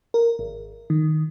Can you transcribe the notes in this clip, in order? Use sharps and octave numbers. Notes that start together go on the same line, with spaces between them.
A#4
G#1
D#3